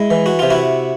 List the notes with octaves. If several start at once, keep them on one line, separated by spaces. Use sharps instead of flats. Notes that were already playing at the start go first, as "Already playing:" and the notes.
Already playing: G#3 E4
E3
F#4
C3 F4
E4 F#4